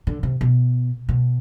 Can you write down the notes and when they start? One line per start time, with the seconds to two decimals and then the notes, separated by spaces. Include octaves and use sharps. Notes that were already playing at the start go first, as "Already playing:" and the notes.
0.07 D3
0.23 C3
0.41 B2
1.09 B2